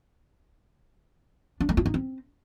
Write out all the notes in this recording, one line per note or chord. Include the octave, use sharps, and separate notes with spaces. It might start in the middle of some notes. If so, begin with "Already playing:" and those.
D4
A3
F4
D#4
C4